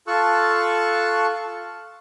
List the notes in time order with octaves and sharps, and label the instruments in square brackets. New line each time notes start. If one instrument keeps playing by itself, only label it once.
[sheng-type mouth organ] F4 A4 A5 C#6 E6 F#6